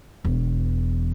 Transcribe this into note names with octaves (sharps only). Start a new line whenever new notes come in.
E1 E2